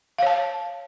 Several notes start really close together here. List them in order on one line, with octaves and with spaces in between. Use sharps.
F5 C#5 A5